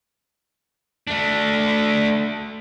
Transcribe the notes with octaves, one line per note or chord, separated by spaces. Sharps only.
A3 D4